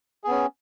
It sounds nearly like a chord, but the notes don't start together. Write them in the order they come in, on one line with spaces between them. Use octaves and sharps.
G#4 B3 C#4